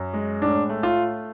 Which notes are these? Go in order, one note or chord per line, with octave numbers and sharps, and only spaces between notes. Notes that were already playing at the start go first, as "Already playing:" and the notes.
Already playing: F#2
G#3
A2 D4
A3
F4